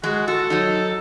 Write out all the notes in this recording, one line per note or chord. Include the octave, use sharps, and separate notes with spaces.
G#3 F#4
F#4 A4
F#3 D#4